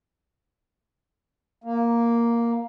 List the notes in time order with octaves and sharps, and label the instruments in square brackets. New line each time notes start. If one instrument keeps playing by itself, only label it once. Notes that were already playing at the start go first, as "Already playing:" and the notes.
[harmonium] A#3